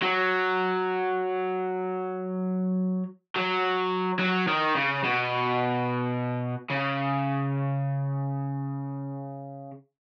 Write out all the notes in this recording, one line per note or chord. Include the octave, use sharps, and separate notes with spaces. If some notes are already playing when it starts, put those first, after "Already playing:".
F#3
F#3
F#3
D#3
C#3
B2
C#3